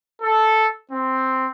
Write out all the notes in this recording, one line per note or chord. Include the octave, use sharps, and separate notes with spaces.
A4
C4